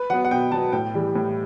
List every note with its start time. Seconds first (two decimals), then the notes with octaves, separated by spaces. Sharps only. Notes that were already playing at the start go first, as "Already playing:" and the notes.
Already playing: B4
0.10 F#3 B3 F#5
0.25 F#5
0.31 B2 G5
0.52 F#3 B3 A5
0.72 A2 G5
0.94 E3 G3
1.15 A2